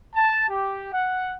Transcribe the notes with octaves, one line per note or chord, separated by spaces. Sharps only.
A5
G4
F#5